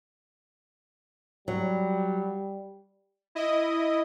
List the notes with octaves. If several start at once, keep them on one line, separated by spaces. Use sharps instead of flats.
F#3 G3
E4 D#5